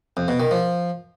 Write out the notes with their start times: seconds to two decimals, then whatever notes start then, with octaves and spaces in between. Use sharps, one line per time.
0.17 F2
0.28 B2
0.40 D#3
0.51 F3